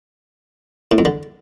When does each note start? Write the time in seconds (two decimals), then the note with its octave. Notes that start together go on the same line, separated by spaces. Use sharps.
0.92 A2
0.98 F2
1.05 D3